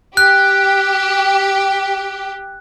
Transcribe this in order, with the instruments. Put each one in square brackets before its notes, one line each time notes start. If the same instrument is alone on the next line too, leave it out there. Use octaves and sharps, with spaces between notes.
[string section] G4 [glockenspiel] F#6